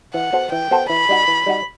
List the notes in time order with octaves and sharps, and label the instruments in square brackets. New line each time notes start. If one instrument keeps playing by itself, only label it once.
[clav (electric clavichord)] E3 [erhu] F#5
[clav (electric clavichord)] B3 F#4 A4 C5
[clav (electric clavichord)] E3 [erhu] G5
[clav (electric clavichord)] B3 F#4 A4 C5
[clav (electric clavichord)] E3 [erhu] B5
[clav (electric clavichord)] G3 D#4 F#4
E3
G3 D#4 F#4